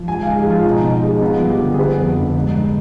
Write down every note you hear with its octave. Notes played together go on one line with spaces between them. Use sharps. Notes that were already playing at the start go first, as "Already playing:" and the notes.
Already playing: F3
G#2 G#5
G#2 F5
G#4
F3 F4
B2 D#4
B2
G#3
B3 F4
G2
G4
D3
G#4
B3 B4
F2
D3
G#2
G#2